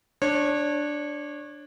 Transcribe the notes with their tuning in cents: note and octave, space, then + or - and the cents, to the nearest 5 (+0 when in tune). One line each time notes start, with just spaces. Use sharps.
D4 +0 C#5 -25